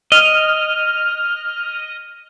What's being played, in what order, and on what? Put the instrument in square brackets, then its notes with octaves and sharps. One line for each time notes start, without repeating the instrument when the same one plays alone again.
[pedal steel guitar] D#5 [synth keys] F6